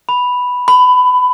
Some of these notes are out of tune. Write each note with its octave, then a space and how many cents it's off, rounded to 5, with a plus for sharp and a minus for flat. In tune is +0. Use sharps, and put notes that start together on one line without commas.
B5 +0
B5 +20